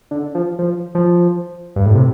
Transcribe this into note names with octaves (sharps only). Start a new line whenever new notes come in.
D3
F3
F3
F3
G2
A2
C3